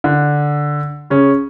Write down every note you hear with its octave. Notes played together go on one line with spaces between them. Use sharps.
D3
C#3 C#4